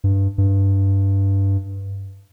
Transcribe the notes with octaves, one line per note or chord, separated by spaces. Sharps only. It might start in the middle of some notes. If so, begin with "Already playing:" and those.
G2
G2